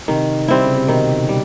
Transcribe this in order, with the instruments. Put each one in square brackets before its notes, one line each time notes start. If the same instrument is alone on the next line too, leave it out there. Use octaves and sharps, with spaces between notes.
[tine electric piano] C3 [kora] D#3
[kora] G3 C4 E4
[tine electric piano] C#3
C3
[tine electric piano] B2 [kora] D#3
[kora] G3